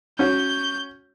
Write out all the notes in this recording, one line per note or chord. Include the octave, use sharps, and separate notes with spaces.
C#4 F#4 G6